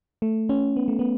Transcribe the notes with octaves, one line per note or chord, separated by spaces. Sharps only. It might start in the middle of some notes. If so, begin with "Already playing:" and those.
A3
C#4
B3
A3
B3